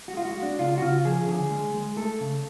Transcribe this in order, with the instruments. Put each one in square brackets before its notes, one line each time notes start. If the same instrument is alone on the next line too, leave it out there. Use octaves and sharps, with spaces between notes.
[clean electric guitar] F#4
G#3 F4
F#4
G#3
D4
C#3 F4
F#4
C#3 F4
F3 G#4
D3 G#4
G#3
G#3
A3 A4
C#3